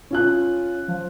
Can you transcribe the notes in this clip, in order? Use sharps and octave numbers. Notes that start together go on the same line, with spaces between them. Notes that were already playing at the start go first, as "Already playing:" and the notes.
C#4 F4 F#6
F3